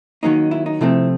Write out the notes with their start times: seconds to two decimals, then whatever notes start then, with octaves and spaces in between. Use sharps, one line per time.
0.23 D#3 F#3 A#3 C#4 D#4
0.51 E4
0.66 D#4
0.81 C3 F3 A3 C4 E4